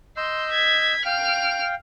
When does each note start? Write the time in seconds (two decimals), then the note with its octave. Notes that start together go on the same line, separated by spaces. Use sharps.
0.17 D#5 C6 E6 G6
0.52 G#6 B6
1.05 F5 G5 F6 D7